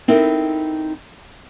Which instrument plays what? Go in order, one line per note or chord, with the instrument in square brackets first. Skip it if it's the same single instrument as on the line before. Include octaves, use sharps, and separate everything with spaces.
[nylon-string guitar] C4 D#4 E4 A4 A#4